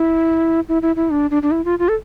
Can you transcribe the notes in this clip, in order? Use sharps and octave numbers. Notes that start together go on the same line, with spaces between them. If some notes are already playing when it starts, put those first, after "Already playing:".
Already playing: E4
E4
E4
E4
D4
D4
D4
E4
F4
F4
A4